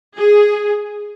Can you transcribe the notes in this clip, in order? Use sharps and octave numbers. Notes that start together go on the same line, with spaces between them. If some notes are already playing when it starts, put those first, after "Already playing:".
G#4